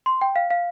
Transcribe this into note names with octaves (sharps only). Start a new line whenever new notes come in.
C6
G5
F5
F5